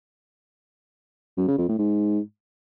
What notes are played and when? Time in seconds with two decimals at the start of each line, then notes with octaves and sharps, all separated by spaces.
1.38 F#2
1.48 C#3
1.58 F2
1.69 A2
1.79 G#2